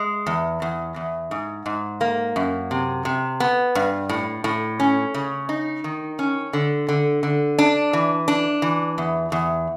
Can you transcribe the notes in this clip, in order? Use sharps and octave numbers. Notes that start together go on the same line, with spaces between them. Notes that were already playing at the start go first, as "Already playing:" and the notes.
Already playing: G#3
E2
E2
E2
G#2
G#2
A#3
F#2
C3
C3
B3
G2
A2
A2
C#4
C#3
D#4
D#3
C#4
D3
D3
D3
D4
E3
D4
E3
E2
E2